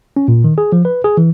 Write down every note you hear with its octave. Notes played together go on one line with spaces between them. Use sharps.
C#4
A#2
D#3
G#4
F3
B4
G#4
E3